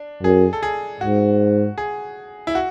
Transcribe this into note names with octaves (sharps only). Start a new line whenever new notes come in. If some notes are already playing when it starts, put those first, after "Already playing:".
Already playing: D4
F#2 G#4
A4
G#4
G#2 F#4
G#4
E4
F#4